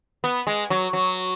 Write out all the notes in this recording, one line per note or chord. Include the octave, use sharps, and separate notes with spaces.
B3
G#3
F#3
F#3